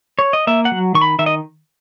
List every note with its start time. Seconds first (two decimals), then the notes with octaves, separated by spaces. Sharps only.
0.19 C#5
0.33 D#5
0.47 A#3 E5
0.65 F#5
0.72 F#3
0.95 D#3 C#6
1.01 B5
1.19 D#3 E5
1.26 D#5